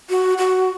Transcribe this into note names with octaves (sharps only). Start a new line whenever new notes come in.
F#4
F#4